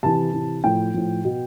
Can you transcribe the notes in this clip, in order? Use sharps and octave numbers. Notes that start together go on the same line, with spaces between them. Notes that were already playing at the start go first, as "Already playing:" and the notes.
C3 E3 A5
C3 E3
A2 F3 G5
A2 F3
B2